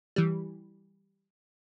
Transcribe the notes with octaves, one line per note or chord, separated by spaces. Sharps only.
E3 G3